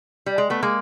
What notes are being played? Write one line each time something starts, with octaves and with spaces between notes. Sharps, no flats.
G3
G#3
A3 B3
G#3 A#3